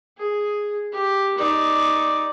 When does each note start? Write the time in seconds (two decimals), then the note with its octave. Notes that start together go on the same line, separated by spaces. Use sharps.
0.18 G#4
0.92 G4
1.38 D#4 D5